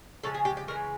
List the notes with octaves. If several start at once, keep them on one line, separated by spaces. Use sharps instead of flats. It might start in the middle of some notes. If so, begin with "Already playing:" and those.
C#3 F3 G#3 A4
G#4
G4
G4
C#3 E3 G#3 A#4